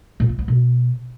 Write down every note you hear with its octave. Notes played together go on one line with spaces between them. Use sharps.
A#2
A3
B3
B2